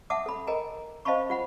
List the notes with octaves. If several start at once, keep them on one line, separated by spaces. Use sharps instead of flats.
E5 F#5 A5 D6 D#6
A4 B5
A#4 D#5 G5 G#5 A#5
C5 D#5 F5 A5 B5 C#6
F4 F#5 B5